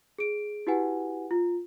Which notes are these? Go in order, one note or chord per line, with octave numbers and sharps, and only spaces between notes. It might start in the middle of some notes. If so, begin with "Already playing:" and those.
G#4 D7
E4 F#4 G4 B4 F#5 G#5
F4